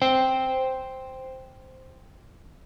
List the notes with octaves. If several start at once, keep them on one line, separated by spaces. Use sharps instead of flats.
C5 G5